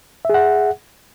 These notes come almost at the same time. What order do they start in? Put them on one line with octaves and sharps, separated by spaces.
E5 G#4 F#5